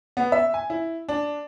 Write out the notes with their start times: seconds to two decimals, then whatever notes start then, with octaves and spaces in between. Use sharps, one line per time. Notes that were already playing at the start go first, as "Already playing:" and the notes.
0.17 B3
0.32 E5
0.54 G#5
0.70 E4
1.09 D4